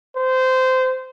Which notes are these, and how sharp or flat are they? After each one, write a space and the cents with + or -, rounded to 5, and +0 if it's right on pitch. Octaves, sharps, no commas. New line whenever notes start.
C5 -20